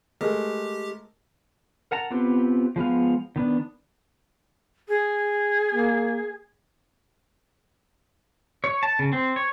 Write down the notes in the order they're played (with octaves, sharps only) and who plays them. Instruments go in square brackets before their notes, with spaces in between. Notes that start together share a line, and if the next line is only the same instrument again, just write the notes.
[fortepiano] G#3 A3 A#4 [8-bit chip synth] G4
[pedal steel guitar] A#4 F#5 A5 A#5
B3 C4 F4 G4 B4
F3 G#3 B3 F5
D#3 B3 D4
[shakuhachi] G#4
[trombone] A#3
[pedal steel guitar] C#5
A5
C#3
C4
C#5